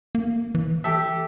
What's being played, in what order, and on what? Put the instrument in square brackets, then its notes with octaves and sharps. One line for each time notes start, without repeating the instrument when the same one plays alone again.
[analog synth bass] A#3
E3
[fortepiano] G4 A4 E5